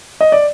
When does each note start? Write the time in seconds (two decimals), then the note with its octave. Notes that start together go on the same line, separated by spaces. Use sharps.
0.21 D#5
0.32 D5